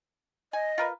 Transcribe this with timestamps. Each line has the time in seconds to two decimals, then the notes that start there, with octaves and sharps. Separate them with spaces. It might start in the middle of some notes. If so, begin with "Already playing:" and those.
0.53 D#5 G#5
0.78 F4 A#4 B4